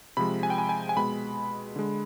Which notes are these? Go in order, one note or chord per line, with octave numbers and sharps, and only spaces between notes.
C3 F3 G#3 B5
G#5
G5
G#5
G#5
G#5
B2 G#3 B5
D3 G#3